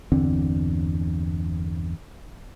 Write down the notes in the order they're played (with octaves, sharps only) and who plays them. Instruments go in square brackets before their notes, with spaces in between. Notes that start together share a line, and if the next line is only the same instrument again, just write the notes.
[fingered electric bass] G1 E2 D3 C4